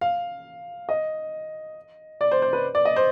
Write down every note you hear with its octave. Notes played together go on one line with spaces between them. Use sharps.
F5
D#5
D5
C5
C5
B4
D5
D#5
C5